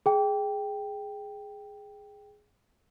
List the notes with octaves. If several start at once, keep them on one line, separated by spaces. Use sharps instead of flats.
G#4 G5